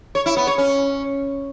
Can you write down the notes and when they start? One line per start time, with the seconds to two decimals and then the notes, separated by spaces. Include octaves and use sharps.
0.15 C#5
0.26 E4
0.36 B3
0.47 C#5
0.58 C#4